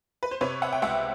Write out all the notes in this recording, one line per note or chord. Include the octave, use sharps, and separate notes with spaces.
B4
C5
C3 B4 C#5
E5 F#5
G5
C#2 E5 F#5